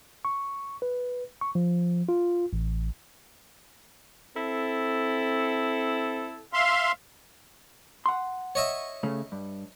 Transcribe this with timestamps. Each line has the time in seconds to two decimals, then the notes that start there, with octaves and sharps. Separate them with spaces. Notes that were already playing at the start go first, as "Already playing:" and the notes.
0.25 C#6
0.82 B4
1.41 C#6
1.55 F3
2.09 F4
2.53 A1
4.35 C4 E4 A4
6.53 E5 F5 C6
8.06 F#5 C6
8.55 C#5 D#5 E5
9.03 C#3 A3 C#4
9.32 G2